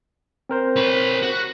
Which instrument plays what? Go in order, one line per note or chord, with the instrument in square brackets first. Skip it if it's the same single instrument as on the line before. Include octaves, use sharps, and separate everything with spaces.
[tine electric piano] C4 A#4 C5
[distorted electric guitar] B4 C#5
F#4